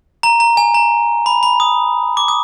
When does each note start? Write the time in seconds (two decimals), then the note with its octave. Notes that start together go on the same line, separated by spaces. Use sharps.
0.23 A#5
0.40 A#5
0.57 G#5
0.74 A#5
1.26 B5
1.43 B5
1.60 D#6
2.17 D6
2.28 D#6